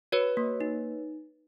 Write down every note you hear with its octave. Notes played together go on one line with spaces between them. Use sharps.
F#4 B4 C#5
A#3
D#4